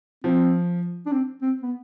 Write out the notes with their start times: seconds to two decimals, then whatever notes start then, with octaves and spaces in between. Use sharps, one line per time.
0.24 F3 C4
1.06 D4
1.12 C4
1.42 C4
1.62 B3